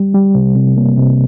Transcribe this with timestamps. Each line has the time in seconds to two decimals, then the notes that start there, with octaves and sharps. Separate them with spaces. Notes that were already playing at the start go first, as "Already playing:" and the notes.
Already playing: G3
0.14 G3
0.35 C3
0.56 C3
0.77 A#3
0.98 C3